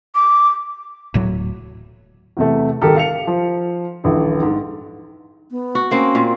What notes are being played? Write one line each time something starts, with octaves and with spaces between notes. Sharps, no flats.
D6
D1 A2 F#3
E2 C3 A3
D#1 G#1 G4 A4 A#4
F5 C#7 F7
F3
D#1 A#1 E3
G#2
B3
F#4
A#3 C4 C#4
A#2